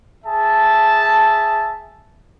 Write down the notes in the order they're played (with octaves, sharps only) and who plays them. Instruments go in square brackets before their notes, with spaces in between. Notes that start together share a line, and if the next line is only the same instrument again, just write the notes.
[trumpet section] G#4 E5 A5